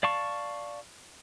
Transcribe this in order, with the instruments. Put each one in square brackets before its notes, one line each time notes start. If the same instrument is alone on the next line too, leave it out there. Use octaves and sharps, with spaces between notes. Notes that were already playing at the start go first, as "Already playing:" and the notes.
[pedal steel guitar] D5 F5 A5 C#6